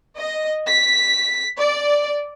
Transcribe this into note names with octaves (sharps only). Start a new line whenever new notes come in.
D#5
B6
D5